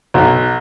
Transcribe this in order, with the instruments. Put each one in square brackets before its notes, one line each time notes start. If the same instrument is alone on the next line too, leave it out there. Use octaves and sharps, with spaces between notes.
[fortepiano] B1